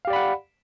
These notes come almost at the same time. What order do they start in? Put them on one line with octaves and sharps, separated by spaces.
F5 G4 D5 B5 F#5